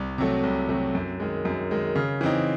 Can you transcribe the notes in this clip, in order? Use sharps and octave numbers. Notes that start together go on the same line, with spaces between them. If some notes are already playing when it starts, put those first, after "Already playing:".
Already playing: C2
C3 F#3 A3
C2
C3 F#3 A3
F#2
D#3 G#3
F#2
D#3 G#3
C#3
E3 C4 D#4